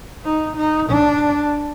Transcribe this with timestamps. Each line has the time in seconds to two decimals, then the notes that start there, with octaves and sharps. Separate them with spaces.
0.24 D#4
0.57 D#4
0.90 D4